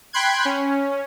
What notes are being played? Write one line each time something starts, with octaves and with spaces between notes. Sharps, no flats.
G5 B5 C6 F#6 G#6
C#4